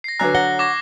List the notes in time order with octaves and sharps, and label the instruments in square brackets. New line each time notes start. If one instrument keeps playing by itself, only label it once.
[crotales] A#6 C7
[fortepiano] D3 F#3 A#5 [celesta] B4 G#5 [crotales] F#6
[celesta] C#5 A#6 [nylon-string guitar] F#5 [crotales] G7
[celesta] C#6 [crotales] D6 G#6 A#6